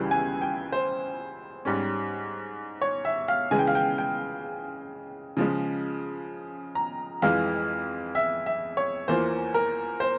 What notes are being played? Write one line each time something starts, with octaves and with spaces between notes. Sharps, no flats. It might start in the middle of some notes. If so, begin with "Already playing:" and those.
Already playing: C#2 C#3 E3 G3
G#5
G5
C5
G#2 G3 C#4
C#5
E5
F5
C#3 E3 G#3 G#5
G5
F5
G5
G5
C#3 F3 G#3
A#5
F2 E3 G#3 F5
E5
E5
C#5
E2 E3 A#3 F4 C5
A#4
C5